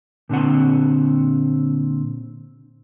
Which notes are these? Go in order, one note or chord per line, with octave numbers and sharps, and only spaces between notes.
A#2 D3 C4 F#5